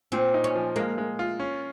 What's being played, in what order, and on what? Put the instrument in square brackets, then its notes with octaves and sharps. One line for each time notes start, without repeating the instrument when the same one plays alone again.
[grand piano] A#2 [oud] C4
[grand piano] D#4
[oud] C#4
[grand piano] F3
[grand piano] G#3 [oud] A#3
[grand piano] G#3
F4
C#4